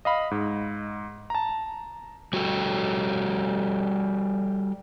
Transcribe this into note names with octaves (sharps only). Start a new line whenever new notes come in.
D#5 F5 B5
G#2
A5 A#5
G3 F#4 G4 A4